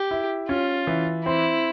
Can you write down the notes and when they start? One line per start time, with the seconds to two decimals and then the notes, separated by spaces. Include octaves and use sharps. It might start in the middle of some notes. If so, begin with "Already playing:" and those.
Already playing: G4
0.11 E4
0.49 C#4 F4
0.87 E3
1.25 C4 E4